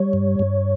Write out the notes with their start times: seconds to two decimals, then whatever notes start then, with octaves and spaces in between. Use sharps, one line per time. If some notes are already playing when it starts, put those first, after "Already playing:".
Already playing: G3 C#5
0.13 G2
0.39 G2